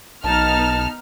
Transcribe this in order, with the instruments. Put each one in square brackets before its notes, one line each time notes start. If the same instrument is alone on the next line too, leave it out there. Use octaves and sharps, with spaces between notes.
[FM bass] B1 [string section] B3 D#4 F6 [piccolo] A5